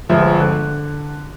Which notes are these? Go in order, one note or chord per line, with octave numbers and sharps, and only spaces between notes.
G1 F3 G#3 E5
D3 F#6